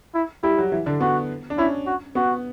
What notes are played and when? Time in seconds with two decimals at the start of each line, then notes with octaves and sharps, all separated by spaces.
0.15 E4
0.43 G3 E4 G4
0.58 F#3 F#4
0.72 E3 E4
0.86 D3 D4
1.01 B3 F#4
1.50 D4
1.58 C#4 E4
1.87 F#4
2.15 B3 F#4